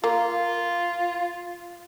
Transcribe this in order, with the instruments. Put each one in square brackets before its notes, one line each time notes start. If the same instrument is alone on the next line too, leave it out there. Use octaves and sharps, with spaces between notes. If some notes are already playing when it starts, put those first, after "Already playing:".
[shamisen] A#3 [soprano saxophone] F4